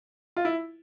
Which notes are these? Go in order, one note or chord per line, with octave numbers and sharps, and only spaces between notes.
F4
E4